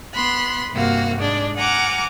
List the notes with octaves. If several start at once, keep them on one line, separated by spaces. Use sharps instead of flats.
B3 B5 C6 F#6
G2 C3 A#3 F#4 F5
G#2 G#3 D4 D5
F#5 G#5 A#5 D6 F6